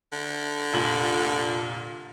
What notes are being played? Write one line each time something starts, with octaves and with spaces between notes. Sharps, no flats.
D3
F1 A#2 F#7